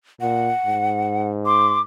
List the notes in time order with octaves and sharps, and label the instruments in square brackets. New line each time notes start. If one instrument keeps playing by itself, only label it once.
[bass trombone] A#2 [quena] F#5
[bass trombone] G#2
[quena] C6 [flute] D6